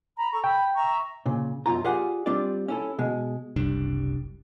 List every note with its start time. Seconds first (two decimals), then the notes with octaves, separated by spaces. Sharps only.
0.17 A#5 B5
0.31 A4 A#5 C#6
0.44 G5 B5
0.74 E5 A#5 C#6
1.26 A#2 C#3
1.66 F#2 B2 F4 A#5
1.84 F4 G4 G#4 D5 F5 F#5
2.26 G3 C4 D4 F4 D5
2.68 C#4 E4 A4
2.99 B2 G#3
3.56 F#1 C2 G3 D4